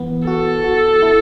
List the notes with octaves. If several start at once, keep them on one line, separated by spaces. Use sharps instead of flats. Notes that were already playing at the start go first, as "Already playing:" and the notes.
Already playing: E3 B3
F#4 A4
F#4
E4